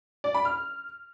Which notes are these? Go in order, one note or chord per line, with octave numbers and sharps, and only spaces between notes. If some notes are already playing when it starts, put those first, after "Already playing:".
D5
B5
F6